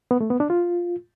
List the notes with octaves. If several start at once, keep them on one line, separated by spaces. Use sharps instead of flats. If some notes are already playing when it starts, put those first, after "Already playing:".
B3
A3
B3
D4
F4